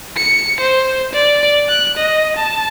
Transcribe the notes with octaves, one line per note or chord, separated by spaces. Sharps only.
C#7
C5
D5
F#6
D#5
A5